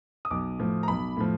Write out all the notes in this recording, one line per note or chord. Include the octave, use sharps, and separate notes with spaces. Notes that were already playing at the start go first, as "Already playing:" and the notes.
D#6
B1 D6
A2 F3
A#5
B1 B5
A2 F3